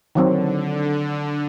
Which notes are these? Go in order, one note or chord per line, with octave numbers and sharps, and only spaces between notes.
D3 D#3 F#3 C4